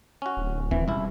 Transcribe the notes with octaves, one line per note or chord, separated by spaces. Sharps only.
C#4 F#4
D1
D#2 E3 C4
C#2 B2 G3 E4